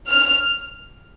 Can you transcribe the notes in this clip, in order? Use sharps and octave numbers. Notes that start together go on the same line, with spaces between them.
F6